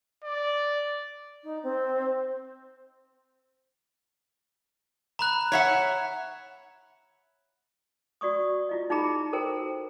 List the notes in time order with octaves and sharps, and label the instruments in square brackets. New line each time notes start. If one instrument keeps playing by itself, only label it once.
[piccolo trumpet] D5
[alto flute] D#4
C4
[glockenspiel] A#5 B5 F#6
[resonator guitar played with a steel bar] C#5 E5 F#5
[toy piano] F#4 D5 C#6 D#6
E4 F4 D#5
D#4 E4 G#4 A#5 B5
F#4 A4 A#4 C5 G5